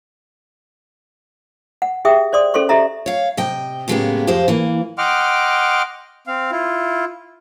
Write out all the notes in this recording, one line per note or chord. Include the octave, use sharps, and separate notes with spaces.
F#5
G4 G#4 E5 G5 D#6
C5 D5 C6 D#6
C#4 A4 C5 C6 C#6
G4 A4 D#5 E5 A#5
C#5 F5
C3 D#5 G5
A2 C#3 G#3 A#3 B3 G4
F2 G#3 G4 C5 F5
E3 A#3
D#5 F#5 G5 C6 D6 F6
C4 F5
E4 F4